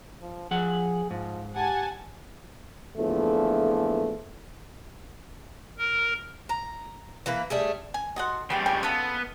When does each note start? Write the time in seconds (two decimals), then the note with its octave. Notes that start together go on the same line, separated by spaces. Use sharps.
0.22 F3
0.51 F3 G#4 F#5
1.11 G#2 F3
1.55 G4 F#5 G#5 A5
2.97 E2 A#2 D3 E3 F3 A3
5.78 A#4
6.49 A#5
7.26 E3 A#3 B4
7.50 G3 A3 G#4
7.94 G#5
8.16 F#4 A4 D#5 F#5 C6
8.50 C#3 G3 B3 G4 A4
8.66 G4 A4 G5 G#5
8.83 C#3 B3 F4 A4 A#4 D#5